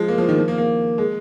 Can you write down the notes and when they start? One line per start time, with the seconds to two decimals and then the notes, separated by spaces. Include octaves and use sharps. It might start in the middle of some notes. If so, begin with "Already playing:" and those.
Already playing: F3 G#3
0.08 A#3
0.18 F3
0.28 D#3
0.38 F3
0.48 A#3
0.58 A#3
0.98 G#3